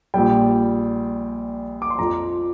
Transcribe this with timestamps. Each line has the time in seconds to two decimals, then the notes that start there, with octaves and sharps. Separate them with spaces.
0.14 A#1 A#2 G3 G5
1.82 D6
1.90 C6
1.99 F2 F3 A#5